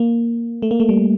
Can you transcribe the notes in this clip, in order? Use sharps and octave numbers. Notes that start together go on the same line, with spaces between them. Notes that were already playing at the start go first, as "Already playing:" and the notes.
Already playing: A#3
A3
A#3
A3
G3